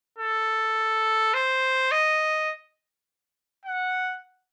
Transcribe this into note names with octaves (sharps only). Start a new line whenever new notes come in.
A4
C5
D#5
F#5